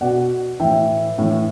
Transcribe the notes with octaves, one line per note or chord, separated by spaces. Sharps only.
B2 D5 F#5
A2 E3 E5 G5
A2 E3